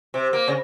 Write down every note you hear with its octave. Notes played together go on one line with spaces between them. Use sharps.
C3
A#3
C#3